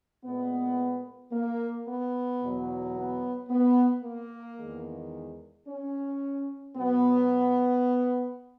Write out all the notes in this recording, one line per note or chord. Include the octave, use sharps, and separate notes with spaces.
A#2 G#3 B3
A#3
B3
E2 B2 F#3
B3
B3
A#3
E2 D#3 G#3
C#4
B2 F#3 B3